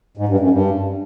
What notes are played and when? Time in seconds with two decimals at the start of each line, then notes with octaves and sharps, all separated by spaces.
0.17 G#2
0.28 G2
0.40 F#2
0.51 G2